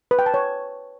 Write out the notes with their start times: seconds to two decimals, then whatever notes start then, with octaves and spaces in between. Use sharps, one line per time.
0.11 B4
0.19 G5
0.26 A5
0.34 C#5